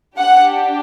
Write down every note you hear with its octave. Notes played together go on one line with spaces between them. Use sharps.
D4 G4 F#5